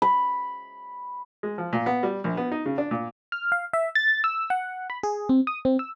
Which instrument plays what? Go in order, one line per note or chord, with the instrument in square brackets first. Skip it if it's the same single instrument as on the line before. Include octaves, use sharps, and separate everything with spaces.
[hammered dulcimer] B5
[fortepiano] G#3
F3
A#2
B3
G3
A#1
B3
D#4
C#3
D4
A#2
[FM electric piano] F6
F5
E5
A6
E6
F#5
B5
G#4
C4
D#6
C4
E6